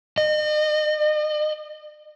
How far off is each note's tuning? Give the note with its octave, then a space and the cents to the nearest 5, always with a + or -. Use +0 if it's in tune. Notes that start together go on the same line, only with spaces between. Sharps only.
D#5 -40